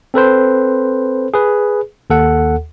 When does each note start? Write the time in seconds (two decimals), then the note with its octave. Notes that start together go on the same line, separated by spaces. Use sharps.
0.14 C4 A4 B4 C5
1.34 G#4 B4
2.10 D#2 A4 F#5